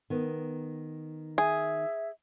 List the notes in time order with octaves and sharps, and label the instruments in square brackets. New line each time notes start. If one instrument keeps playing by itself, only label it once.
[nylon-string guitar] D#3 B3
[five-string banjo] G#4 [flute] E5